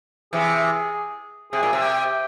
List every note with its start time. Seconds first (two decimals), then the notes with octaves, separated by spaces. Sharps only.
0.33 C3 E3 G#4
1.52 C3 G#4
1.63 A#2
1.73 C3
1.82 G4